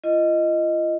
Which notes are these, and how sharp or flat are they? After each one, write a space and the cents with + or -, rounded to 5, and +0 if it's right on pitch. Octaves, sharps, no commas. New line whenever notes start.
F4 -35 D#5 +0